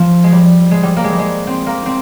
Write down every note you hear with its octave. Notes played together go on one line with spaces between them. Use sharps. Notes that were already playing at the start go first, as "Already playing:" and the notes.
Already playing: F3
G#3
G3
G#3
G3
A#3
G#3
G3
G#3
C4
A#3
C4